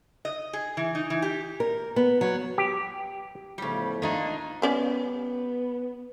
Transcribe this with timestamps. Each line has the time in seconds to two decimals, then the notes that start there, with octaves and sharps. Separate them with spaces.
0.25 D#5
0.53 G#4
0.77 E3
0.95 D#4
1.10 E3
1.22 G4
1.60 A#4
1.96 B3
2.21 F#3
2.58 G4
3.58 E2 A2 C#3 F3 G3
4.02 D#3 A#3 D4 D#4 F4
4.62 G3 B3 C#4 D5